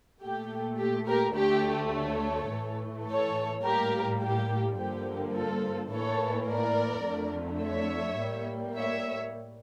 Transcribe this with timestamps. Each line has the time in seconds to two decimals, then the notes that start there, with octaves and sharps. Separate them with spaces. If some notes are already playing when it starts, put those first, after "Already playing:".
0.22 A#2 A3 G4
0.79 G4
1.07 G4 A#4
1.36 D2 D3 A3 G4
1.93 A4 C#5
2.50 A2 E3 A3
3.07 A4 C#5
3.63 A2 G3 A#3 G4 A#4
4.20 G4
4.77 G2 D3 F3 A#3 G4
5.34 F4 A4
5.91 A2 E3 A#3 A4 C#5
6.48 A#4 D5
7.06 F2 D3 A3
7.62 C#5 E5
8.19 A2 G3 A#3
8.75 C#5 E5